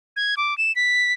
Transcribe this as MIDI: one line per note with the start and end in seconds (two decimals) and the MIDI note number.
0.17 0.35 92
0.37 0.56 86
0.58 0.74 100
0.76 1.13 95